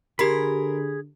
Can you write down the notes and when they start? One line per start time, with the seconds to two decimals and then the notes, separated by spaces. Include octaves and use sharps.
0.19 D3 G4 G#4 A#4 B5 B6